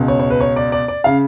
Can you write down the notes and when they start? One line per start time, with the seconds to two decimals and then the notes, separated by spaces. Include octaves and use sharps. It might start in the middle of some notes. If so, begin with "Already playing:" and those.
Already playing: C#2 B2
0.08 C#5
0.20 C#5
0.30 B4
0.41 C#5
0.56 D5
0.72 D5
0.88 D5
1.04 C#3 F5